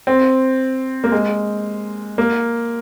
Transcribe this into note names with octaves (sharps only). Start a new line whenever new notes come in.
C4
A#3
G#3
A#3